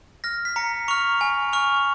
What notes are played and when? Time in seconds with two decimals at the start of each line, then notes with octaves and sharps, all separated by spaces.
0.24 F6 A#6
0.45 B6
0.56 A#5 C#7
0.88 C#6 F6 F7
1.21 G#5
1.53 C#6 F6 F7